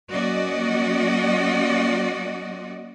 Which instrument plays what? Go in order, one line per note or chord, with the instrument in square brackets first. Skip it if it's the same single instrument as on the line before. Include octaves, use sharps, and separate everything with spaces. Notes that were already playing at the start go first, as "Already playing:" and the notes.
[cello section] F#3 A#3 C#4 F#4 D5 D#5